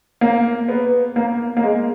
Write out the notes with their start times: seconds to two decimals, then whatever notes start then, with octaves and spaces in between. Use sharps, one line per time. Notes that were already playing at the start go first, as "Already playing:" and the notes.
0.21 A#3
0.68 B3
1.16 A#3
1.57 A#3
1.63 G#3